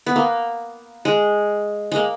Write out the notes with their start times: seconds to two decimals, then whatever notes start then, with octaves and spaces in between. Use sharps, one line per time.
0.06 B3
0.16 A#3
1.05 G#3
1.92 G#3 A#3